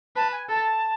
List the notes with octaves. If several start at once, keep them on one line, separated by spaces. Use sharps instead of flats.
B4 A5
G#5
A4 A5